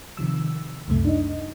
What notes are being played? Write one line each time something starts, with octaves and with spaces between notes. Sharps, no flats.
C3 D#3 F3 E6
C#2 F#2 C3 A3
D4 D#4 D#5